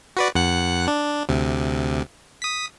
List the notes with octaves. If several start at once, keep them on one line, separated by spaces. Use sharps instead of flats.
F#4 B4 D5
F2 F#5 F#6
D4
D2 C3
D#6 B6